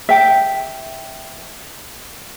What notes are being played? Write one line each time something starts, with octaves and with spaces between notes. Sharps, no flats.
E5 G5